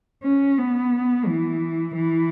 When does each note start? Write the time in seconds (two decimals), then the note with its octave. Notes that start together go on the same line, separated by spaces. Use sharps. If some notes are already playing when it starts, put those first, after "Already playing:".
0.24 C#4
0.58 B3
1.27 E3
1.95 E3